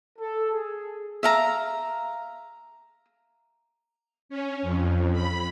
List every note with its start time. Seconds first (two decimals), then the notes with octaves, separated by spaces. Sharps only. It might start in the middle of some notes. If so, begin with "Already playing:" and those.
0.19 A4
0.51 G#4
1.23 E5 F5 A#5
4.29 C#4
4.62 F2
5.12 B5